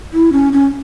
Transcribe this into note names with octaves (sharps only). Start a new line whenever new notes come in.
E4
C#4
C#4